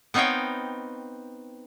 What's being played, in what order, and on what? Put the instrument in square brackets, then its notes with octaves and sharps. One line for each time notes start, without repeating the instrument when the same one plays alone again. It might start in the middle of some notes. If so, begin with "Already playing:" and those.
[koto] B3 C4 D#4 C#5 F5 G5